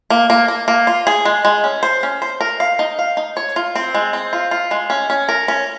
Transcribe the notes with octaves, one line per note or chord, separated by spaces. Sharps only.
A#3
A#3
A#3
A#3
F4
G#4
G#3
G#3
C#4
C5
C#4
C5
A#4
F5
D#4
F5
D#4
C#5
F4
C4
G#3
C4
F4
F4
G#3
C#4
C#4
A#4
C#4